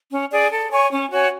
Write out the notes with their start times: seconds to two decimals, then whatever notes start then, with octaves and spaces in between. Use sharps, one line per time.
0.11 C#4
0.31 G#4 D5
0.51 A4
0.71 C#5 G#5 C#6
0.90 C#4
1.10 F#4 C#5 G#5